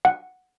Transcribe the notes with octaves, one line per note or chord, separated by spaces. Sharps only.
F#5